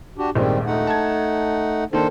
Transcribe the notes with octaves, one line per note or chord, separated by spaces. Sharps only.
D4 F#4 G4
D#1 A#1 D#3 G3 G#3 C4
A3 D#4 F#5
A5 G#6
D#3 A#3 D4 A4 C5